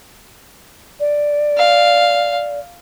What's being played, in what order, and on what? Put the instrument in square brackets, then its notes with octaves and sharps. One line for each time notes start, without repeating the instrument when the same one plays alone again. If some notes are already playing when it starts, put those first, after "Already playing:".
[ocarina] D5
[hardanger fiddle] F5